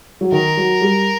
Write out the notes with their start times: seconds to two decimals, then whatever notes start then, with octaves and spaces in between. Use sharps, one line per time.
0.21 F#3
0.32 D#3 A#4
0.57 F#3
0.81 G3